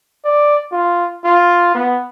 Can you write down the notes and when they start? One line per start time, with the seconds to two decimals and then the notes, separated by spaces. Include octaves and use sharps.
0.25 D5
0.72 F4
1.25 F4
1.75 B3